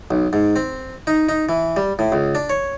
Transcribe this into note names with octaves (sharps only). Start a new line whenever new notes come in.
B1
G#2
C4
D#4
D#4
E3
G3
A2
C#2
D4
C#5